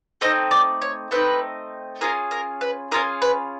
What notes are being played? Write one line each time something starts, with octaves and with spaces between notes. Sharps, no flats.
A3 C4 D#4 D#5
D5
C#5
A3 C4 D#4 B4
C#4 F4 G#4 A#4
A#4
B4
C#4 F4 G#4 A#4
B4